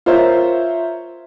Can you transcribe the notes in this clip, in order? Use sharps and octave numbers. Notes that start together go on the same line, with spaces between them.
F4 A#4 C5 C#5 E5